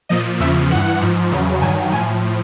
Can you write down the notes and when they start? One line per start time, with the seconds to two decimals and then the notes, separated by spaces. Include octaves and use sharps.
0.09 A#2 F3 D#5
0.40 E2 C#3 F3 E5
0.70 G2 E3 F#5
1.01 G#2 F3
1.31 E2 C#3 F#3
1.62 G2 D#3 F#3 G#5
1.92 A2 F3 G#5